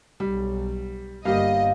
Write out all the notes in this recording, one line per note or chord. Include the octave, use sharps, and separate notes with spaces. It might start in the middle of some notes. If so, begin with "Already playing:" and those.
B1 G3
G1 G3 A#3 G4 D#5 F5